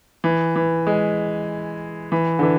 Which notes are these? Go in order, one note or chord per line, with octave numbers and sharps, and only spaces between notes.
E3
E3
G#3
E3
D3
E3